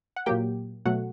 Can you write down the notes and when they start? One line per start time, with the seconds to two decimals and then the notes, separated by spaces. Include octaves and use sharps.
0.16 F#5
0.26 A#2 F#3 A#3 G4 G5
0.85 B2 F#3 A3 F#4 F#5